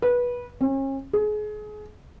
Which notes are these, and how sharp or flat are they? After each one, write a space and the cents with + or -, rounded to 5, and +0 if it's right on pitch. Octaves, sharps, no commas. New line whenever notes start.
B4 -20
C#4 -40
G#4 +30